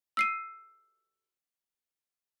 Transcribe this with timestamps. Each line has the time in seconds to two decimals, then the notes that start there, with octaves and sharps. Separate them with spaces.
0.17 E6 C7 D#7